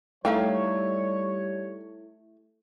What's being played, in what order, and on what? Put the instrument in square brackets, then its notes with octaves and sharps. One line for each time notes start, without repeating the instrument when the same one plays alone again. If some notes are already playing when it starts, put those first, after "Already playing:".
[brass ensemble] G3 C#5 [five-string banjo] A3 [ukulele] D#4 F5 G5 [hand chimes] E4 A4